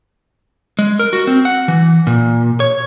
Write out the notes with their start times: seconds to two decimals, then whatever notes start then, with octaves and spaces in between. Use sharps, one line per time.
0.79 G#3
0.99 A#4
1.13 F#4
1.27 C4
1.45 F#5
1.68 E3
2.07 A#2
2.60 C#5